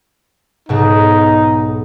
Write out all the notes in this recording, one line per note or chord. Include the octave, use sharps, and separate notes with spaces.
B1 G#2 B2 D#4